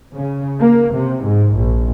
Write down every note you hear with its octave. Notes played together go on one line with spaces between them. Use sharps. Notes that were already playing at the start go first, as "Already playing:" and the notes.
C#3
A#3
C3
G#2
A#1